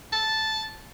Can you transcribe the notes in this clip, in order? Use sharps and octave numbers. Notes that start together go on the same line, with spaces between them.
A5